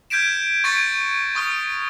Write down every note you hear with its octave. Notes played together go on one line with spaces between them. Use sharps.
F6 G6 G#6 B6 D7 E7
C#6 G#6 A6 B6 C#7 D7
C#6 D#6 F6 G7